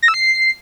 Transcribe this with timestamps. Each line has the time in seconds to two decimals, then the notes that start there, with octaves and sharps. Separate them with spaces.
0.03 A#6
0.08 E6
0.14 C7